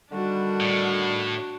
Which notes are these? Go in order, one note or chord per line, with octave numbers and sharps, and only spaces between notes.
D3 D#3 G3 D4 F#4
A2